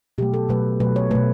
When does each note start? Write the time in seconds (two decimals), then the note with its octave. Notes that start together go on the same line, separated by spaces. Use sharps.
0.18 B2 F#3 A3 G4
0.34 A4
0.49 B2 F#3 A3 B4
0.80 B2 F#3 A3 B4
0.96 C#5
1.11 B2 A3 B4